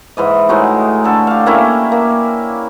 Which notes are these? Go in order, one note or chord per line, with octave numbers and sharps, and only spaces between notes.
G#2 E3 D#5
A2 G#3 D#4 F#4
D3 A4
G4 F5
A3 A#3 C#4 E4
A#3